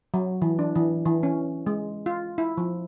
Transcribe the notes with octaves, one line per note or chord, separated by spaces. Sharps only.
F#3
E3
D4
E3
E3
C#4
G#3
F4
E4
F3